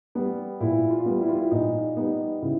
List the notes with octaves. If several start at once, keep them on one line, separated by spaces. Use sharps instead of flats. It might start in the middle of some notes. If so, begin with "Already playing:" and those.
G3 B3
A#2 E4
F4
G3 B3
E4
F4
E4
A#2 D#4
G3 B3 D#4
C#3 E4